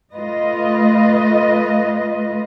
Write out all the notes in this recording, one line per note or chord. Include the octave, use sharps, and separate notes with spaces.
A3 F4 B4 D#5